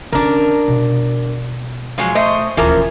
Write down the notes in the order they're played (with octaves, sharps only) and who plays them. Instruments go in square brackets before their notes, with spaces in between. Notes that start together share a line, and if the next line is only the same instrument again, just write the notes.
[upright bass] D3 C#4 [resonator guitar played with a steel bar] D4 A#4
[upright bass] B2
[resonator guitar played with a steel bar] F3 F#3 G#3
A3 C5 D#5
[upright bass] D#1 D2 [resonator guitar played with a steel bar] E3 F3 A#4